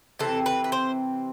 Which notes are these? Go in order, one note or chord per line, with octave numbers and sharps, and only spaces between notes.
C3 E3 C4 A4
B4
B4
C5